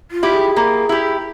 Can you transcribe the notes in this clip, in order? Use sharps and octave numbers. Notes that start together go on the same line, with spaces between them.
F4
E4 G4
G#4
A#3
E4 G4